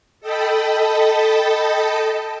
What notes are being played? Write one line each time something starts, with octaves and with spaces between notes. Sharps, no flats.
A4 D#5 G5 A5 B5